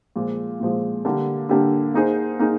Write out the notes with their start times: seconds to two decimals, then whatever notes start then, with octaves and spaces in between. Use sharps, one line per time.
0.16 A#2 F3 G#3
0.60 A#2 F3 G#3
1.05 D3 G3 A#3 D4 G4
1.49 D3 G3 A#3 D4 G4
1.94 A#3 D#4 G#4 C5
2.39 A#3 D#4 G#4